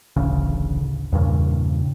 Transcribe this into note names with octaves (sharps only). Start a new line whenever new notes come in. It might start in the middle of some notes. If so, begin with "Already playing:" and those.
D1 A1 D2 C#3
E2 G2 A#2 C#3